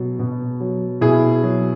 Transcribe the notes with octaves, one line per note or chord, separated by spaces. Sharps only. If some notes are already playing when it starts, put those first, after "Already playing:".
Already playing: B2 F#3
B2
F#3
B2 E4 G#4
F#3